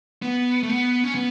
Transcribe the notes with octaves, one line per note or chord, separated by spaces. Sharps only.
B3
A3
B3
C#4
B3